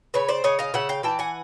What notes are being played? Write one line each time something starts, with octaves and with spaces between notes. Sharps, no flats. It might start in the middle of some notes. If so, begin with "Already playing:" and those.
C#3 B4 C#5
C5 D5
C#3 C#5 D#5
D#5 F5
C#3 E5 F#5
F5 G5
E3 G5 A5
F#5 G#5